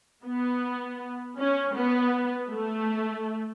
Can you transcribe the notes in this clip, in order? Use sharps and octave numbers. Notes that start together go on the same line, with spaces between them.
B3
C#4
B3
A3